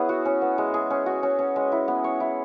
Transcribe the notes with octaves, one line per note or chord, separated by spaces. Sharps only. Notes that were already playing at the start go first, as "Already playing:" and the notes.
Already playing: B3 C#4 E4 G#4
F#4
C#4
B3
G#3
G#4
C#4
F#4
C#4
C#4
G#3
E4
B3
C#5
E4